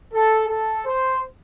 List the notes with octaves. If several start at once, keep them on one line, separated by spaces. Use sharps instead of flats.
A4
A4
C5